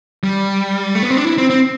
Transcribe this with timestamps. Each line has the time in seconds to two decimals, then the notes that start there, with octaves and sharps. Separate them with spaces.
0.24 G3
0.95 A3
1.03 B3
1.10 C4
1.17 D4
1.25 E4
1.38 C4
1.50 C4